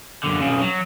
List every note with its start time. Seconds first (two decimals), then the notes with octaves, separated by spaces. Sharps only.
0.24 F#2 D3
0.41 B1 C#3
0.62 F#3